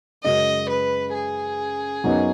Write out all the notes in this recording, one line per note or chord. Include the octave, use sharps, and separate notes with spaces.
F#2 C#3 G#3 C#4 F#4 D#5
B4
G#4
F#2 F#3 B3 D#4